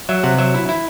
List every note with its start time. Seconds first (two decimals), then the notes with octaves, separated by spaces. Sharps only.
0.09 F#3 E5
0.23 C3 F#5
0.38 F#3 E5
0.54 E4
0.69 E4